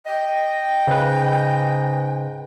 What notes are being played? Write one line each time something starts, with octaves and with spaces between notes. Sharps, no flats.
D#5 G5
G#2 C#3 B4